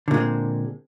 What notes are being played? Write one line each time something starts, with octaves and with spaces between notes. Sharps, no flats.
A#2 D3 G#3 C4